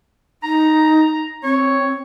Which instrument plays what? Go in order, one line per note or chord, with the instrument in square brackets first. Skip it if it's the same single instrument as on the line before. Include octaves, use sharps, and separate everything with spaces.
[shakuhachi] D#4 [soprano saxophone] A#5
[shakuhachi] C4 [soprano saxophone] C#5